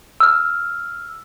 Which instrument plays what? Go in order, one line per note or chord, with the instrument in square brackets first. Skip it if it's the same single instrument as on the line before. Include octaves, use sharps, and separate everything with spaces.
[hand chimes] E6 F6